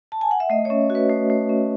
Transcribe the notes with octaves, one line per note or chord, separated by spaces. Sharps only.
A5
G#5
F#5
E5
A3 D#5
C#4 C#5
F#4
B4
A3
A3
C#4